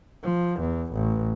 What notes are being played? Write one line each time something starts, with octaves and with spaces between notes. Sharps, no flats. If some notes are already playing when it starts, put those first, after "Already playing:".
F3
E2
A1